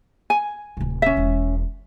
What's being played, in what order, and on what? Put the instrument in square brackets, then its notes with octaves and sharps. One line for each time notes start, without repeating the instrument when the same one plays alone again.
[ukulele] G#5
[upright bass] D1 C3
[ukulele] C#4 E5
[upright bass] E1